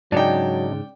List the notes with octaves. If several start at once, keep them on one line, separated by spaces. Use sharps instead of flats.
G#2 C#3 F#3 D4 D#4 D5 G5